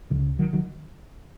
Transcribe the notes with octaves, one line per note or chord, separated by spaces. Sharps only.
C#2 C#3 D#3
D#3 F#3
D#3 F#3